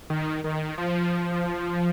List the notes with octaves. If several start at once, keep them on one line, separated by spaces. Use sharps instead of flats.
D#3
D#3
F3